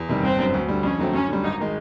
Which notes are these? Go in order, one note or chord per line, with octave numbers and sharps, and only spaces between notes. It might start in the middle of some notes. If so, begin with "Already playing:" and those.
Already playing: E2
C3 D#3 G3
G1 C4
F#2 D3
D2
D3 G3
F2 C#4
D3 F#3 A3 C4
F#2 C#4
D3 G3
G#1 D#4
D#3 G#3